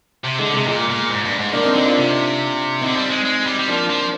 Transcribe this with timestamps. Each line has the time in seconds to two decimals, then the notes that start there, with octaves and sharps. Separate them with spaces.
0.24 C3
0.38 D3 G#3
0.53 C3 G#3
0.67 A#2 G#3
0.89 A#2
1.10 G#2
1.25 G2
1.39 G#2
1.52 D#3 A#3 D4
1.63 C4 D#4
1.74 D3 C4 D#4
1.85 D4 F4
1.96 C3
2.81 D3 C4 D#4
2.96 G3
3.10 G#3
3.25 G#3
3.46 G3
3.59 G3
3.68 F3 A#3 D4
3.90 F3